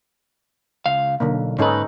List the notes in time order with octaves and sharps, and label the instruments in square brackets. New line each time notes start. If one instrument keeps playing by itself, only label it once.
[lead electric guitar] C#2 F5
[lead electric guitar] B1 [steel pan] D3 A#3
[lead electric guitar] G#2 B4 [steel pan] C#4 D#4 A4